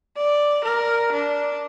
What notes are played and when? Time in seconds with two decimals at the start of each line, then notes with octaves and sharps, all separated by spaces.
0.17 D5
0.64 A#4
1.12 D4